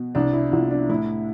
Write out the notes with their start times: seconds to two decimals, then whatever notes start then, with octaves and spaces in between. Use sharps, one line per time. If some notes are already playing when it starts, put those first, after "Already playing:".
Already playing: B2
0.15 C2 D4
0.33 E4
0.52 C2 F4
0.71 D4
0.89 A2 E4